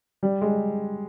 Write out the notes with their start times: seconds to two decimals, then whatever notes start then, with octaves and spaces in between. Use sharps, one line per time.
0.23 G3
0.41 G#3